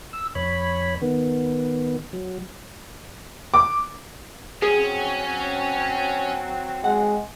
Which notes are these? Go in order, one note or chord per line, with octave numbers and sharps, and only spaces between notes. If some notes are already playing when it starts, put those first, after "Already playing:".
E6
F2 C#5 B5
D#3 B3
F#3
D6
F#3 C4 C#4 G#4
G#3 F#5